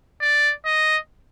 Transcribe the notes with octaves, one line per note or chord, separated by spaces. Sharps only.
D5
D#5